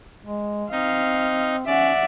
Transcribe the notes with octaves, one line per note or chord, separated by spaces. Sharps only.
G#3
C4 D#4 F5
C#4 D5 E5 F#5